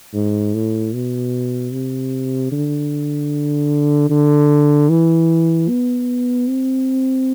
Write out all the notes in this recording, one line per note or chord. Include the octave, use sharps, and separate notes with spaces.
G#2
A2
B2
C3
D3
D3
E3
B3
C4